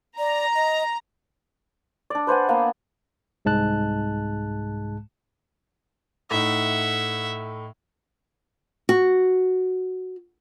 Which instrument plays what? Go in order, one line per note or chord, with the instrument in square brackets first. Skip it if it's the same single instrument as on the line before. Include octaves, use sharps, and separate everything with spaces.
[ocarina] D5 [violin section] A#5
[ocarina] D#5
[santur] D4 D5
B4 C5 F#5 G#5
A#3 B3
[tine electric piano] C2 G#2 G#3 A5 F#6
[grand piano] A2 D#4 [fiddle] E5 F#5
[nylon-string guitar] F#4